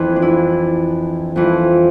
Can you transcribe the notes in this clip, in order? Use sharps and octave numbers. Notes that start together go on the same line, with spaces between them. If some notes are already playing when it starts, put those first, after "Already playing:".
Already playing: F2 E3
D4
E4
F2 E3